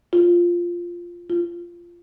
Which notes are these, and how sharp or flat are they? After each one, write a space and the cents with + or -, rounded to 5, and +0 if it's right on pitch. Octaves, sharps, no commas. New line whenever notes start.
F4 -5
F4 -15